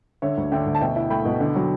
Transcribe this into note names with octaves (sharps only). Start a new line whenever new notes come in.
D3 C#5 E5
D2
D3 E5 G5
D2
A5
B2 E5 G5
E4
A3 G5 B5
B2
D3
F#3